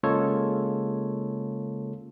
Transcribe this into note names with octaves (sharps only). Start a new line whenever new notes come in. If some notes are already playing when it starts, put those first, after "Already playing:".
C#3 G#3 A#3 F4 A4 C#5